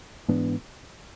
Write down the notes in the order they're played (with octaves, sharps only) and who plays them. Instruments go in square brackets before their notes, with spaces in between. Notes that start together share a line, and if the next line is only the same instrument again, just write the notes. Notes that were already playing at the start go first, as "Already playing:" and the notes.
[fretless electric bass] G#2 E3 B3 D4